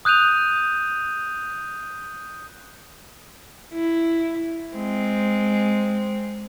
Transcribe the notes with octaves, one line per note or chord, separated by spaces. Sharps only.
D#6 F#6 G6 D#7 F7
E4
G#3 C4